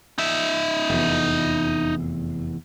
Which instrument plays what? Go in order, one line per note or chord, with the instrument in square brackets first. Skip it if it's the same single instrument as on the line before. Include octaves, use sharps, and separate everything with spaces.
[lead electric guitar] D#4 E5
[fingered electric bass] F1 E2